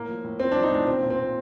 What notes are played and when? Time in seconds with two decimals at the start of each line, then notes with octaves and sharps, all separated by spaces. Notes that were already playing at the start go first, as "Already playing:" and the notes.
Already playing: A2 A#3
0.08 F3
0.24 A2
0.40 F3 C4
0.52 F3 D4
0.63 D#4
0.71 A2 D4
0.87 A#2 C4
1.02 A#2
1.10 C4
1.18 A#2